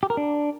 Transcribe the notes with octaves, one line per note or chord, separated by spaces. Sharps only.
G4
A#4
D4